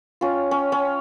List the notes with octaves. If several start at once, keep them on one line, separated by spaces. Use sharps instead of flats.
C#4 F4
C#4
C#4